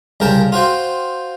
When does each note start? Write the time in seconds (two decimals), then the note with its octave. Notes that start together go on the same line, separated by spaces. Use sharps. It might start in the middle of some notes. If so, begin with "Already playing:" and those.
0.20 C2 C#3 A#4 G5 A5
0.52 F4 F#4 C5 G5